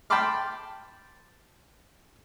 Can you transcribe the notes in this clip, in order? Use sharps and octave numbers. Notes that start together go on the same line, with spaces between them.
G5 A5 B5 C6 D6 F6